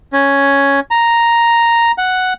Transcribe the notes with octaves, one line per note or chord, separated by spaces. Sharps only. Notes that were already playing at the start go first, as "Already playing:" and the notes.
C#4
A#5
F#5